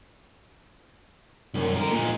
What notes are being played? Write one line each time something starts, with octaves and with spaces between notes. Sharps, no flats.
C2 F#2
D3 A#4
A#2 G#3